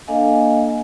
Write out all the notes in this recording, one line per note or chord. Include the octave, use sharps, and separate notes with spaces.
A#3 D4 A4 D#5 F5 G#5